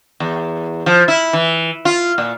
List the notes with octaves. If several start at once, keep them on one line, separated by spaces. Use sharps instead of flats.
E2
F3
E4
E3
F4
A#2